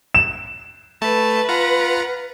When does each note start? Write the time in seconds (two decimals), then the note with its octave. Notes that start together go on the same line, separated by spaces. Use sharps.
0.15 E7
1.02 A3 B4 A5
1.49 F4 F#5 A#5